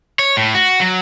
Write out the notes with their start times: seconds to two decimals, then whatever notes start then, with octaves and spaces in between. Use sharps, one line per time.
0.19 C#5
0.37 A2
0.55 F#4
0.81 F#3